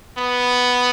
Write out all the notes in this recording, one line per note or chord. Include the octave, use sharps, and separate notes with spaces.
B3